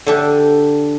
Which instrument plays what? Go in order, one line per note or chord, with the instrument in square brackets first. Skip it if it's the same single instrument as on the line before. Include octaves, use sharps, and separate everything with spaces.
[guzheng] D3 D4 G4